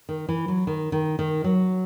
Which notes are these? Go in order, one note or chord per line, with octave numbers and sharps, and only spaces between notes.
D#3
E3
F#3
D#3
D#3
D#3
F#3